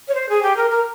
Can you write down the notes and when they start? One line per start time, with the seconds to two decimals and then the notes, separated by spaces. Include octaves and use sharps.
0.08 C#5
0.14 C5
0.29 G#4
0.42 G4
0.56 A#4
0.70 A#4